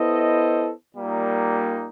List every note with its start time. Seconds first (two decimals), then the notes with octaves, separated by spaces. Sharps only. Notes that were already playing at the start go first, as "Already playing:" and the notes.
Already playing: B3 E4 A4 C5 D#5
0.94 A#2 G3 A#3 D#4